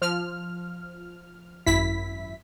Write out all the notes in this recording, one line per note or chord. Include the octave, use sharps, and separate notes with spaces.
F3 F6
G#1 F#2 E4 B6